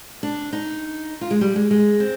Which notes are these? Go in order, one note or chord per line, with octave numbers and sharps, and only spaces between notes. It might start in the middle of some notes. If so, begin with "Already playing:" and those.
D4
D#4
F4
G#3
G3
G#3
G#3
C4